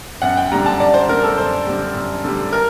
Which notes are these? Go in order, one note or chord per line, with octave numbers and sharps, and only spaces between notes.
F#2 F#5
G5
D3 G3 A#5
A5
F#2 D5
C5
D3 G3 A#4
A4
F#2 C5
D3 G3
F#2
D3 G3
A#4